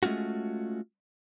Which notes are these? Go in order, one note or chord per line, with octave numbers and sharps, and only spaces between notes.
G#3 A3 C#4 F4 F#4